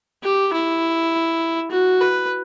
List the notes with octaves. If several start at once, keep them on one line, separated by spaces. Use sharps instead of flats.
G4
E4
F#4
B4